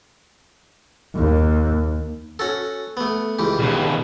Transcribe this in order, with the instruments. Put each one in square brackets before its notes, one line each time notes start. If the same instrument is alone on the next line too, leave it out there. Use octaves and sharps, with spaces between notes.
[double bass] D#2
[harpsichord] C#4 F#4 A4
A3 B3
C#2 E3 G4
[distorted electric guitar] D#2 B2